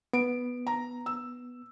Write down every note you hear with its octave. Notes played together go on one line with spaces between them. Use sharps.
B3 D7
A#5
E6